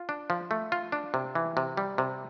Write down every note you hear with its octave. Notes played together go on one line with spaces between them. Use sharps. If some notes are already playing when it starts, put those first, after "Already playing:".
Already playing: F4
D4
F3
A3
F4
D4
C3
E3
C3
G3
C3